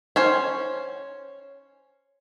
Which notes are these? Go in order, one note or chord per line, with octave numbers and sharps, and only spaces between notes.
C#4 C5 G#5